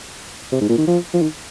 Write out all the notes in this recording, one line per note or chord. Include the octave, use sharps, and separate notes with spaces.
C3
G#2
A#2
D#3
F3
F3
D#3